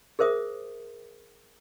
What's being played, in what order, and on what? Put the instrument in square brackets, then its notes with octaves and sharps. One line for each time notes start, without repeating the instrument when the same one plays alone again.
[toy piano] G#4 A#4 C5 E5 D#6